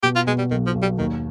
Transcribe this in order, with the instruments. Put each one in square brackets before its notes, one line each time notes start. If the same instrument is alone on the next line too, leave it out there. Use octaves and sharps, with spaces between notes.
[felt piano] B2 [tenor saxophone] G4
[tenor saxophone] F4
[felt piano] B2 [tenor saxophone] G#3
[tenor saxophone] G3
[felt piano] B1 [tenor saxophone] D#3
[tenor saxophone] F3
[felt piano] B1
[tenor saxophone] G3
[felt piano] D#2 [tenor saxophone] D#3